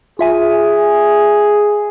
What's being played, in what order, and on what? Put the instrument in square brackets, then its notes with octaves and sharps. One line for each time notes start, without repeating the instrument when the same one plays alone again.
[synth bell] F4 E5 G#5 [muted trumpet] G#4